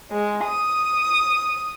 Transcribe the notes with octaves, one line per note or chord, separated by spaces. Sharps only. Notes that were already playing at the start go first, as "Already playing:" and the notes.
G#3
D#6